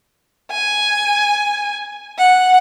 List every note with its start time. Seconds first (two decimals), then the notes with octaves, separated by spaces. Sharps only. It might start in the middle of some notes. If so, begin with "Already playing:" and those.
0.52 G#5
2.18 F#5